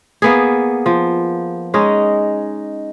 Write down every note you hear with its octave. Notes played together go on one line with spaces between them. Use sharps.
A#3 B3 G#4
F3
G#3 C#4 D#4